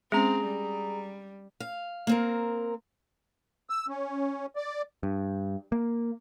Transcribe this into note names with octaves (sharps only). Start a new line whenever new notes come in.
G#3 C4 C#4 G#4 A#5
G3
F5
A#3 C4 A#4
E6
C#4
D5
G2
A#3